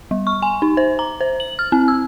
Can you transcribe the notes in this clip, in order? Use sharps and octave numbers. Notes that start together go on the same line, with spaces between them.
G3
C#6
G#5
D#4
C5
A#5
C5
F#7
F6
C4
E6